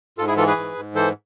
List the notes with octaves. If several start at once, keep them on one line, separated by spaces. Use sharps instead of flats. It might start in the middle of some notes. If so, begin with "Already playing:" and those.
G#2 F4 A4
E4 G#4
E3 F4 A4
G#4 B4
G#2
G#2
E3 A4 C5